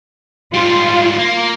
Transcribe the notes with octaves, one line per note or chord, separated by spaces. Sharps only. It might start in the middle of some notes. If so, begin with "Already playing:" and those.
G#2 G3 F4
A#3